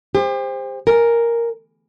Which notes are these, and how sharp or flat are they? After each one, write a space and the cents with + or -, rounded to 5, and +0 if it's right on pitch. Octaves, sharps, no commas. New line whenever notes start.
G4 +40 C5 +0
A#4 +0 G#5 +0